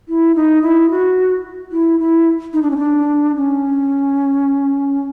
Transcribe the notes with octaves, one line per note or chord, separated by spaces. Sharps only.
E4
D#4
E4
F#4
E4
E4
D#4
D4
C#4
D4
C#4